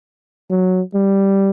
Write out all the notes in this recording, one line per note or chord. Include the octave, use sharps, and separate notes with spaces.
F#3
G3